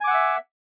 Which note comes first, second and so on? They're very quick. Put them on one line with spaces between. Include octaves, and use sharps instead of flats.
G#5 D6 F#5 E6 E5